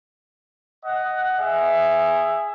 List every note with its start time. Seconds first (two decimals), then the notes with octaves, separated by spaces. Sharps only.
0.85 D#5 F#5
1.40 G#4 E5